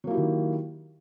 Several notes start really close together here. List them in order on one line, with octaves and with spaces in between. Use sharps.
F#3 A#3 E4 G4 D#3